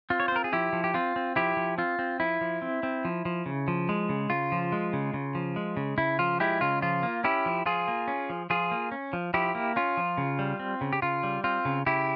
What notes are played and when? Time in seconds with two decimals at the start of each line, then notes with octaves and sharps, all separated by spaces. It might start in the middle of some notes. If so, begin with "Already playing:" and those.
0.10 C4 F4
0.20 C#5
0.28 C5
0.32 C4 A#4
0.44 G#4
0.52 F3 E4 G4
0.73 F3
0.84 G4
0.94 C4 F4
1.16 C4
1.36 F3 E4 G4
1.57 F3
1.78 C4 F4
1.99 C4
2.20 F3 E4
2.41 F3
2.62 C4
2.83 C4
3.05 F3
3.25 F3
3.46 C#3
3.68 F3
3.89 G#3
4.09 C#3
4.30 C#3 F4
4.52 F3
4.72 G#3
4.93 C#3
5.14 C#3
5.35 F3
5.56 G#3
5.77 C#3
5.98 C#3 E4
6.19 F3 F4
6.40 G#3 E4 G4
6.61 C#3 F4
6.82 F3 F4
7.03 A#3
7.24 C#4 E4 G4
7.46 F3
7.66 F3 F4 G#4
7.88 A#3
8.08 C#4
8.30 F3
8.50 F3 F4 G#4
8.71 A#3
8.92 C#4
9.13 F3
9.34 F3 E4 G4
9.55 A#3
9.76 C#4 F4
9.97 F3
10.18 C#3
10.39 G3
10.59 C4
10.81 C#3
10.93 G4
11.02 C#3 F4
11.23 G3
11.44 C4 F4
11.65 C#3
11.86 C#3 E4 G4